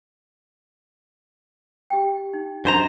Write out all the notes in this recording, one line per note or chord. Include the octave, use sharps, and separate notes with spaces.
G4 G5
D#4
F#2 D4 C5 D#5 A#5